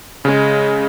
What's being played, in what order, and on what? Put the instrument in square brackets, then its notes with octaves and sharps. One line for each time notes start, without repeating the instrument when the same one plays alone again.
[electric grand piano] C#3 [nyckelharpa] G#3